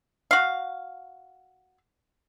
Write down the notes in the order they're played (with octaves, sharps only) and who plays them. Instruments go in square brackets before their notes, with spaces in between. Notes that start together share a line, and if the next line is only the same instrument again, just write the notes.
[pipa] F#4 F5